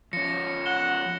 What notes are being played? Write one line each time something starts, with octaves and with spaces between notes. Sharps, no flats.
F3 C#4 A#6 C#7
F#5 E7 G7